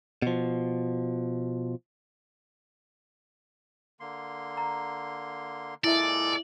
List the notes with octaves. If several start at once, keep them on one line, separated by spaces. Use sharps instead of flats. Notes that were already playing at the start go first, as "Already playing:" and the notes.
B2 F3
D3 A#3 C6
A#5
A#2 G#3 E4 A4 D5 E5